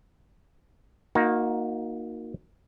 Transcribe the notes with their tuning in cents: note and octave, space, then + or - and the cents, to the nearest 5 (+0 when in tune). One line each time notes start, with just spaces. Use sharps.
A#3 +0 D#4 +5 F#4 -25